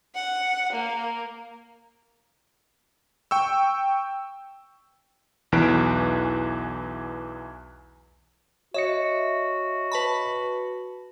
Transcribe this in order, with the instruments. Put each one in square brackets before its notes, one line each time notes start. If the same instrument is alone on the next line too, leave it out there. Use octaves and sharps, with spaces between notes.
[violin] F#5
A#3
[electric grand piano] G5 C#6 E6
B1 E2 E3 B4 D7
[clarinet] F#4 [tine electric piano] C#5 D#5 C#7 [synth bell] E5
[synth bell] B4 A5 B5